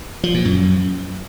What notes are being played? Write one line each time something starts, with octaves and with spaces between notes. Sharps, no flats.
F3
A#2
F#2